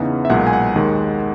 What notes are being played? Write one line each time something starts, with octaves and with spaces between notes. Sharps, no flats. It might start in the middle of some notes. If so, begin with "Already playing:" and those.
Already playing: E2 C#3 E3 B3 D#4 F#5
E5
B1 A#2 G#3 F#5
G#5
F#5
D#2 D#3 G#3